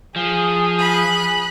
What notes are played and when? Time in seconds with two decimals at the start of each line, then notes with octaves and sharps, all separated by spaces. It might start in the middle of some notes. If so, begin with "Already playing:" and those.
0.16 F3 G#4
0.79 B5 F#6